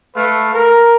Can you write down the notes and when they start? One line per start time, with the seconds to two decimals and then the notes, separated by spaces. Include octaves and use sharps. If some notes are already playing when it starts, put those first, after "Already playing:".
0.16 A3 B4 F5
0.54 A#4